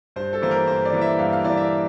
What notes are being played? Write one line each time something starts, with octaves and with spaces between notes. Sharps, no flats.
G2 C5
A4
E3 A#3 E4 C5
A#4
G2 C5
D5
E3 A#3 E4
E5
G2 F5
F5
E3 A#3 E4 D5
E5